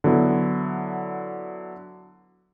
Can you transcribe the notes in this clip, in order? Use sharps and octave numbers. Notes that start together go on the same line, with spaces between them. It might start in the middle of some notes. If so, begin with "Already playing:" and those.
D3 F#3 B3 E4